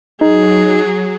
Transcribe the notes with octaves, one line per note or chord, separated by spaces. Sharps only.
F#3 D#4 G#4